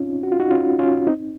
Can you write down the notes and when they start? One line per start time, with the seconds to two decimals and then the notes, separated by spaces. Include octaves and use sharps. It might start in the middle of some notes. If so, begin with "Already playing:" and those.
Already playing: C4 C#4 D#4 F4
0.23 F#4
0.32 F4
0.40 D#4 F#4
0.51 C#4 F4
0.79 C#4 F4
1.07 C4 D#4